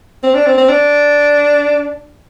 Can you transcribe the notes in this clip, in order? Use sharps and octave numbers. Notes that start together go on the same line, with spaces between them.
C4
D4
C4
C4
D4